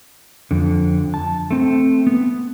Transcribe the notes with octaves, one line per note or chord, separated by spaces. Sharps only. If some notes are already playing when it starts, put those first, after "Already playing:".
F2 D3
A5
A3 C4
B3